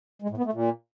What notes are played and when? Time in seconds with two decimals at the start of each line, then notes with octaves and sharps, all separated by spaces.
0.22 G#3
0.30 A2
0.37 B3
0.45 A3
0.53 A#2